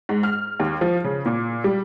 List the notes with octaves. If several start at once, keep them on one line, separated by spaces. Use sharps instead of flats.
G#2
F6
D#2
F3
C#3
A#2
G3